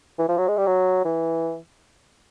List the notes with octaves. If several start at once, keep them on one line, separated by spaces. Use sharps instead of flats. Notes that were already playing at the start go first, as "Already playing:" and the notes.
E3
F3
F#3
G#3
G3
F#3
E3